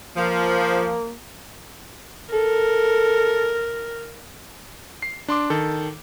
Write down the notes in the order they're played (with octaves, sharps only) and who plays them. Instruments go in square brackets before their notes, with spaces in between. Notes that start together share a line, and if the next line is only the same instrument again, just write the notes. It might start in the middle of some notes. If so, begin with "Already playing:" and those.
[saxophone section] F3 [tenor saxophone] A#3
[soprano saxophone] A4 [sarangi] A#4
[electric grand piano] C7
D4 C6 D6
D#3 A4